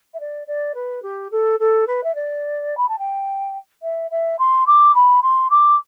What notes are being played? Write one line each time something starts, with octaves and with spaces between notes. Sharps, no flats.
E5
D5
D5
B4
G4
A4
A4
B4
E5
D5
B5
A5
G5
E5
E5
C6
D6
B5
C6
D6